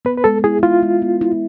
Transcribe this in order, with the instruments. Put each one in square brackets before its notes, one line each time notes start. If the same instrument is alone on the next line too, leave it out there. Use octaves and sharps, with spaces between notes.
[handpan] B3 [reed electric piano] B4
[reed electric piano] B4
[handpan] G#3 [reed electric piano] A4
[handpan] E4 [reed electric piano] G#4
[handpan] E4 [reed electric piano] F4
[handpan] G#3
B3
E4